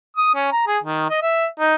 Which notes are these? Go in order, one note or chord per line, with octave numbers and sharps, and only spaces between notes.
D#6
C#4
A#5
G#4
D#3
D#5
E5
D#4